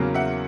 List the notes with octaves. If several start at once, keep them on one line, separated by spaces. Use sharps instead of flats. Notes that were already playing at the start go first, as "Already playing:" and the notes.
Already playing: E2 C#3 F#3 A#3
E5 F#5